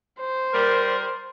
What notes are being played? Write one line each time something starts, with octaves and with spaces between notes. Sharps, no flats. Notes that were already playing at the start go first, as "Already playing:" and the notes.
C5
G3 A#4